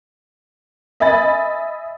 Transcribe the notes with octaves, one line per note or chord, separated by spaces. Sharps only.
D#5 E5 G#5 B5 A6